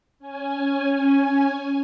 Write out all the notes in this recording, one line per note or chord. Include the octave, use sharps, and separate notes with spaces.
C#4 G#5